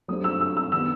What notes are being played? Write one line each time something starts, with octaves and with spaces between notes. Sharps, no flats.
F#3 A3 D4 G4 C5 D#6
E6
E6
E6
D#3 G3 B3 E6